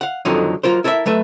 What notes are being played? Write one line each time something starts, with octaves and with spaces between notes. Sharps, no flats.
F5 F#5
F2 D3 D#3 F3 F#3 D#4
F#3 F4 A#4 C5
E4 A4 A#4 C#5 E5
F#3 A3 B4 E5